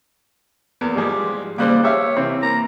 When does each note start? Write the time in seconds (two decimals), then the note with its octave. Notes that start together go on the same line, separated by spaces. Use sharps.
0.81 E2 A#3 B3
0.96 G#2 F3 G3 G#3 G4 G#4
1.58 C#3 G3 A#3 C5 D6 F#6
1.83 G4 C#5 E5 F5
2.17 C3 E3 C4
2.42 A#3 A#5